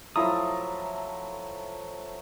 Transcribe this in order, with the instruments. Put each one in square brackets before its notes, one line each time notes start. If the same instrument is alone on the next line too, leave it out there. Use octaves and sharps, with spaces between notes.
[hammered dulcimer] F3 F#3 A3 [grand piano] E4 F4 A#5 [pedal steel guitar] D#6